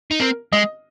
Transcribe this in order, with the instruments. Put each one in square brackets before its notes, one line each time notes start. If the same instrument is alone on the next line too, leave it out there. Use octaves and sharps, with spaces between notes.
[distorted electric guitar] D#4
[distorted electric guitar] C4 [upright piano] A#4
[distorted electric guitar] G#3 [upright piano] D#5